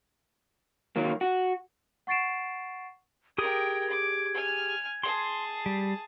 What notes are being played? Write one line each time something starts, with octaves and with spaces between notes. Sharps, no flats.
D#3 F#3 A#3
F#4
F#5 C#6 A6 C7 D7 E7
G4 G#4 A#4 G5 D#6 G#6
D6
G#5 F6
G#4 A5 C6
G3